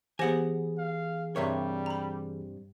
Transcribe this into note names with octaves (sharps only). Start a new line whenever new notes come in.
E3 B3 G4 G#4 C5 F#5 G#5 A#6
F5
G2 C3 G3 A#4 C#5 E5
A#5 B5